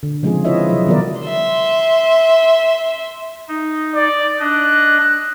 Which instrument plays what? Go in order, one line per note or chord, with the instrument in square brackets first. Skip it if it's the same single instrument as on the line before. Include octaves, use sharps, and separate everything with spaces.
[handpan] D3
C#3 F3 G#3 C4 F4 G#4
E4 F4 B4 C#5 D#5 E5
C3 F#3 E5
D#3 F#3 B3 F#4 A#4 D5
[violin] E5 C6
[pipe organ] D#4
[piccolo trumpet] D5
[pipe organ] D4 D#5 [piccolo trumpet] F#6